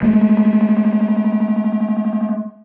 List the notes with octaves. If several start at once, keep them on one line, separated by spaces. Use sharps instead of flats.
G#3 A3